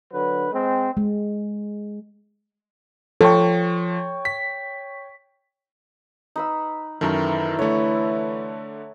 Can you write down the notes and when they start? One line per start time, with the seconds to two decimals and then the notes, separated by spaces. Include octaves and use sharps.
0.11 D3 F#3 B4
0.51 G#3 C4
0.97 G#3
3.21 F3 A4 C#5 G5 C#6
4.25 B6
6.36 D#4 B4 E6
7.01 F#2 D#3 E3 A3 E4 A#5
7.59 D3 A3 C#5 E5